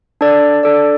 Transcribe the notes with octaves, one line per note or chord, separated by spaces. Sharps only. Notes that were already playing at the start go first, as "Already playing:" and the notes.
D4 A4 D5
D4 A4 D5